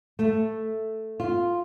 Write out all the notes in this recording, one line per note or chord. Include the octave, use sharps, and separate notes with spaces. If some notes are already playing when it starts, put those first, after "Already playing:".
A3
F4